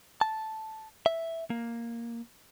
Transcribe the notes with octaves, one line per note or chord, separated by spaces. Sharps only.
A5
E5
A#3